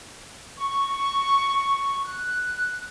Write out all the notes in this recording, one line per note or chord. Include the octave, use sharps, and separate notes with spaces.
C#6
F#6